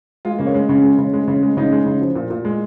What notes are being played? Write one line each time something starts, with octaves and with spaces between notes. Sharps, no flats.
G#3 F4
C#3 A#3
C#4
G#3
C#3 C#4
G#3
C#3
G#3
C#3
G#3
C#3 D#4
G#3
C#3
F3
A#2
A#2
G#3